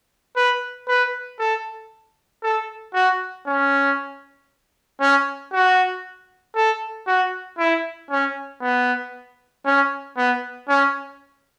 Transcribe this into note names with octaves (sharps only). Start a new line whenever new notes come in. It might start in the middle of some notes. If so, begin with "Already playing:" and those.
B4
B4
A4
A4
F#4
C#4
C#4
F#4
A4
F#4
E4
C#4
B3
C#4
B3
C#4